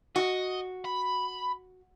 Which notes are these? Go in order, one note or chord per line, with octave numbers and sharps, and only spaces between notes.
F#4 D#5
B5